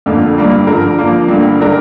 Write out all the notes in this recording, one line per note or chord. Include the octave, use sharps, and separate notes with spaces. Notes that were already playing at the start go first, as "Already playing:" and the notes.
F2 D3 F3 A#3
G2 G3 A#3 D4
D3 F3 D4 A#4
F3 A#3 D4
G2 D3 G3 A#3
D3 G3 D4 A#4